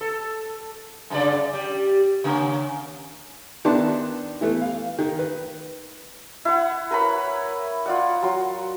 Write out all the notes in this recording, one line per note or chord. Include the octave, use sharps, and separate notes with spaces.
A4
F#2 C#3 D5
G3 G4
C#3 A#3 C#4
D#3 B3 D4 E4 A5 C6
E3 A3 B3
F5
D#3
B4
E4 F#5
A#4 B4 C#5 B5
F4 D5 F#5
F#3 C6